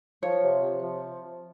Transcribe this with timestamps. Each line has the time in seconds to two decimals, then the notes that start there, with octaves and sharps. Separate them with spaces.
0.22 F3 C#5
0.43 C3
0.63 C3
0.83 F3